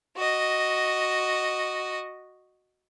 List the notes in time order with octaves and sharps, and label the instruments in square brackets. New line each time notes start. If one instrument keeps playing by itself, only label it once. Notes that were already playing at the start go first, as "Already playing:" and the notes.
[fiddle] F#4 D#5